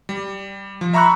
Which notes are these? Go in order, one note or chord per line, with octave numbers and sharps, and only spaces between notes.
G3
F3
E5 A#5 B5 C#6 E6 F#6